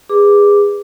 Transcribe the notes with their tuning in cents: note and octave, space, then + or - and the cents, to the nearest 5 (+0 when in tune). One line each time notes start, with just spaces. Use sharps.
G#4 -25 B4 +0 D6 +0